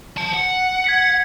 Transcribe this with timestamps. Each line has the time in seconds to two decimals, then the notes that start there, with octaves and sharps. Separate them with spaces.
0.17 C5 A5
0.34 F#5
0.84 G#6 B6 C#7